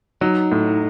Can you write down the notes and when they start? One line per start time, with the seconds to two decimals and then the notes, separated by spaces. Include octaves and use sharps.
0.21 F#3 D#4
0.52 A2